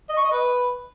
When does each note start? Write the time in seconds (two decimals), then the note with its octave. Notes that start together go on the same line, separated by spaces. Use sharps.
0.09 D#5
0.17 C#6
0.24 D#5
0.32 B4